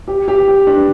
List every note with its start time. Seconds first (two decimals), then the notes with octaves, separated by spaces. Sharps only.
0.08 G4
0.28 G4
0.48 G4
0.67 D4